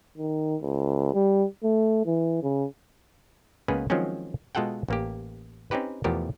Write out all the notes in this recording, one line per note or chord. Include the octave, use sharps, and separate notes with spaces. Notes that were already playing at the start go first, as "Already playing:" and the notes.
D#3
C#2
G3
A3
E3
C#3
C#2 A#3 B3 C#4 G#4 B4
D#3 F3 F#3 G#3 C4 C#4
B2 G#3 F4 A4 F#5 G5
A1 A#3 G4
C4 C#4 D#4 G4 B4
E2 B2 F3 A3 G4 A#4